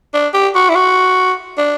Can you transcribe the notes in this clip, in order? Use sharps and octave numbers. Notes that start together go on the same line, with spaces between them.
D4
G4
F#4
E4
F#4
D4